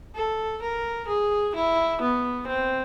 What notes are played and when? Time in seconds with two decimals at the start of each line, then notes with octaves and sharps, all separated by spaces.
0.15 A4
0.62 A#4
1.07 G#4
1.55 E4
2.01 B3
2.47 C4